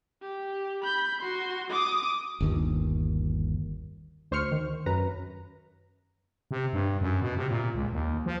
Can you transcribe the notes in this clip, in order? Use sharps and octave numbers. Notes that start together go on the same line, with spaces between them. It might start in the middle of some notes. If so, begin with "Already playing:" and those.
G4
B5 G6
F#4 C6
D6 D#6
G1 D#2
D2 C5 C#6 F6 C#7
D#3
F#2 B4 A#5
C3
G2
F#2
B2
C3
A#2
C#2
D#2
F3